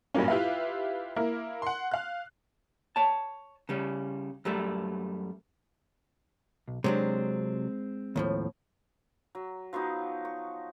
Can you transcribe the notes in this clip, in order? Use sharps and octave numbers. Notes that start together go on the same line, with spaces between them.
G2 A#2 F#3 A#3 C#4
E4 F4 G4 B4 E5 F5
A#3 E4 A#4
F#5 C6
F5 F#6
C#5 A5
C#3 G3 C#4
F#2 G3 A3
B1
C3 F#3 G#3 C4 D4
D#2 A2 F3
F#3
F3 F#3 B3 D#4
C#6